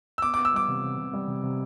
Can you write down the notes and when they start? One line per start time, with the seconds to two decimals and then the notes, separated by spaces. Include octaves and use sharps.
0.18 E6
0.22 B3 D6
0.34 B3 D6
0.45 E6
0.53 G3 D6
0.68 C3
0.83 C3
0.98 C3
1.13 G3
1.27 C3
1.43 C3